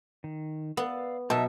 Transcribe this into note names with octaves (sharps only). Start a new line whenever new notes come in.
D#3
B3 D5 F5 E6
B2 F#3 B3 D#4 E5 A5